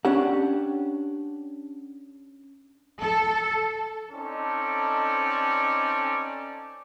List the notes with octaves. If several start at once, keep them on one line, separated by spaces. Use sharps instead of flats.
C#4 D4 G4 F#5
A4
C4 C#4 D#4 A4 D5